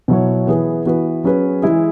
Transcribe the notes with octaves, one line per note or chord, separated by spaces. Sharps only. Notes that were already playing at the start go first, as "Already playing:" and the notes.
B2 F#3 E4 C#5
E3 B3 G#4 B4
E3 B3 F#4 B4
F#3 C#4 G#4 B4
E3 G#3 E4 G#4